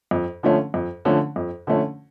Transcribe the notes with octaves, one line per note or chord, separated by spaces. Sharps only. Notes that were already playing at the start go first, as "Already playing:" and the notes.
F2
D3 F3 A3 C#4
F2
D3 F3 A3 C#4
F2
D3 F3 A3 C#4